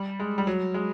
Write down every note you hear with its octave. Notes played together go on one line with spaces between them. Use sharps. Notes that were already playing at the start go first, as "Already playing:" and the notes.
Already playing: G3
G#3
G3
F#3
G#3